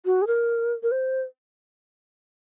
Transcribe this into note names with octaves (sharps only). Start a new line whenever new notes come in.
F#4
G#4
A#4
A#4
C5